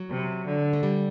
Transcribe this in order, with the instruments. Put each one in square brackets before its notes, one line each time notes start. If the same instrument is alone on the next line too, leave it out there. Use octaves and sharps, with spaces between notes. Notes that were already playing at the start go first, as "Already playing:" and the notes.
Already playing: [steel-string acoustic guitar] F#3
[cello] C3
D3
[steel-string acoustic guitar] A3
G3